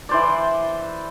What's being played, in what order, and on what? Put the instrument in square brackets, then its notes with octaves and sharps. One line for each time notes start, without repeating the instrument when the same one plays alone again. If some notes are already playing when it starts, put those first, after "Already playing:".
[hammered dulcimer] E3 C5 D5